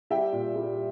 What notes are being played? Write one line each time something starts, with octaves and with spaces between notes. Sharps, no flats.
G3 E5 G5
A#2
G3